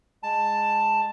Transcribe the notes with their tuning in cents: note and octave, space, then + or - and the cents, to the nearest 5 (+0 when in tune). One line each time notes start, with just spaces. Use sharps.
G#3 -10 A5 +5